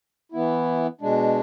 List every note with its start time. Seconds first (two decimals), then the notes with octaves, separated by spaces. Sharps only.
0.32 E3 B3 E4
1.01 B2 G#3 D4